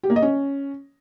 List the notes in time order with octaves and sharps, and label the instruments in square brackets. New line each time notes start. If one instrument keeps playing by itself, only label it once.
[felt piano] G4
A#3
D#5
C#4